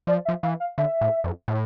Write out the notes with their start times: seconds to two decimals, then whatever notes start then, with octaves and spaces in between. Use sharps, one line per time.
0.07 F3 D5
0.25 E5
0.29 F3
0.43 E3 F5
0.60 F5
0.78 D3 E5
1.01 A2
1.24 F2
1.48 A2